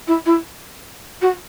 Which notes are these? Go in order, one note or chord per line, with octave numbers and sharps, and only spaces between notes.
E4
E4
F#4